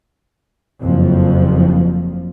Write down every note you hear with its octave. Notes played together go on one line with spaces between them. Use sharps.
F#1 F2 F3